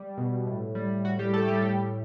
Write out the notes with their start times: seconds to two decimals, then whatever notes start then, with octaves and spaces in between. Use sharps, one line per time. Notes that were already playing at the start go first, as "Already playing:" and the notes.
Already playing: G3
0.18 B2
0.47 A2
0.75 G3
1.04 A2 F#4
1.19 G3 G4
1.33 G3 A3 A4
1.48 G3 G4
1.62 A2 G3 G4